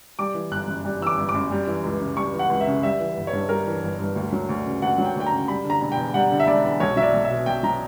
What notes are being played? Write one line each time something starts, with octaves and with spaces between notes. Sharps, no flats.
G3 D6
E3
G1 F#6
F#2
G3
E3 E6
D6
G1
D6
F#2
G3
E3
C#2
C#3
G3 C#6
E3
F#5
C#2
E5
C#3
G3 E5
E3
G1
C#5
G2
G3 A#4
E3
G1
G2
D2
F#3
D2
C#3
D2 F#5
F#3
G5
D2 G5
A#5
C#3
G3 B5
D3
A#5
E1
G5
E2
G3 F#5
D3
E5
E1 D5
E2
B1 C#5
F#3 E5
D5
B1
E5
B2
B1 G5
F#3 A#5